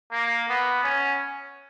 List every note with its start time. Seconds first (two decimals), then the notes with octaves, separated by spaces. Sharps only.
0.12 A#3
0.49 B3
0.84 C#4